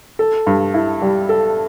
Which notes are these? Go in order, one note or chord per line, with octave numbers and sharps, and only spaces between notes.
A4
G2
E4
G3
A4